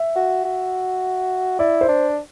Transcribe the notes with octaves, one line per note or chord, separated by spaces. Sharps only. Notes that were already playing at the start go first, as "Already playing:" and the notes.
Already playing: E5
F#4
F#4
E4 D5
C5
D4